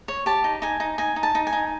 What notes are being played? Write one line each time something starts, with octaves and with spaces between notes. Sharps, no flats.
C#5
G4 A5
D#4
D#4 G#5
D#4
D#4 G#5
D#4
A5
D#4
G#5
D#4